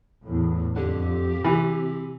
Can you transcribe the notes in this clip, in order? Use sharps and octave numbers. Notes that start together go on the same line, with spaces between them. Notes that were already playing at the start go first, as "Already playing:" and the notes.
E2 A2
F2 D3 G4
C3 E3